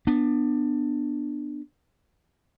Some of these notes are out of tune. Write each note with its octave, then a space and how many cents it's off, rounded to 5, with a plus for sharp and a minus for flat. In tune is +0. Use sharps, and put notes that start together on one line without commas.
B3 +0 D4 +15